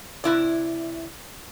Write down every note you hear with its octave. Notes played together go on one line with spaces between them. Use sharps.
C3 E4 D5